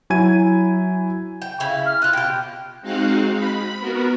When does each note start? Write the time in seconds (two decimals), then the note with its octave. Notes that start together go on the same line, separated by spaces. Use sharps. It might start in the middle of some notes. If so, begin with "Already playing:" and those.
0.10 F#3 E4 G#5 G#6 D#7
1.42 G5
1.60 C#3 E4 F5
1.86 F6
2.02 D#4 F4 F#6
2.13 B2 G4 G5
2.81 G#3 C4 D#4 F#4 F5 F#5
3.36 B5
3.80 B3 F#4 A#4